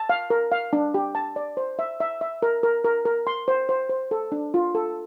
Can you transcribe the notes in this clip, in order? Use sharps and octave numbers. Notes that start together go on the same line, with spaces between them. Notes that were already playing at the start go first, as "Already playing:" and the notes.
Already playing: A5
F5
A#4
F5
D4
G4
A5
D5
C5
E5
E5
E5
A#4
A#4
A#4
A#4
C6
C5
C5
C5
A4
D4
F4
A4